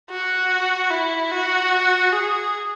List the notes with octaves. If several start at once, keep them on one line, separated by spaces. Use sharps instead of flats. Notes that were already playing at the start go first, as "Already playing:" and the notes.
F#4
E4
F#4
G#4